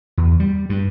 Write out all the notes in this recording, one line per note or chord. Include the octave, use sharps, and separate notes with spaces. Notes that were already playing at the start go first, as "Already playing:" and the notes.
E2
G3
G2